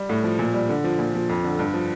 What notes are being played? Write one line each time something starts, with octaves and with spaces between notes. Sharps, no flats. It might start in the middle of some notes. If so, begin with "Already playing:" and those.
Already playing: G3
A2
F3
A#2
G3
D3
F3
A#2
F3
F2
D3
G2
F3